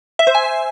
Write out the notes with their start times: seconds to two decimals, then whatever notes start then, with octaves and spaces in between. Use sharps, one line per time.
0.19 E5
0.27 C5
0.35 G#5